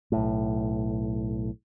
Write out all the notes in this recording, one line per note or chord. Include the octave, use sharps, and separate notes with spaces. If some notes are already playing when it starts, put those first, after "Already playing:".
B1 A2